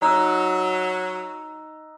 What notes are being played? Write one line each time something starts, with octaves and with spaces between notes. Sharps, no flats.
F#3 D#4 D#5 A#5 E6 F#6